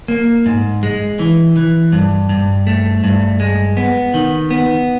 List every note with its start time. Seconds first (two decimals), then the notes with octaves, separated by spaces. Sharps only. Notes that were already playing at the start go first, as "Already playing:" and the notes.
0.08 A#3
0.46 G#2
0.83 G#3
1.19 E3
1.56 E3
1.92 G2
2.29 G2
2.67 A3
3.04 G2
3.40 G#3
3.77 B3
4.14 D#3
4.51 B3